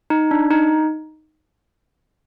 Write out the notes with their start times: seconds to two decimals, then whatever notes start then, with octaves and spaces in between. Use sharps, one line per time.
0.10 D#4
0.31 D4
0.51 D#4